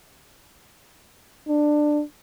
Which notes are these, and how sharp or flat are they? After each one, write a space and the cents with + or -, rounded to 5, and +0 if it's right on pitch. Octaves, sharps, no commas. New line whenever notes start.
D4 +15